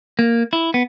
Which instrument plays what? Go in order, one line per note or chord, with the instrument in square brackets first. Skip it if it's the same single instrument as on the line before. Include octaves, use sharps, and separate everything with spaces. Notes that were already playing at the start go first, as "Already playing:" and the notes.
[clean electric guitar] A#3
E4
B3